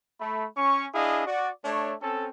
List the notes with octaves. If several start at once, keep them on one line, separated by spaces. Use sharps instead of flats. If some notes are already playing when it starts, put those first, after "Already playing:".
A3 B5
C#4 C#6
D4 E4 G#4 D#5 F5
F#4 D5
A3 D4 C#5
C4 C#4 A4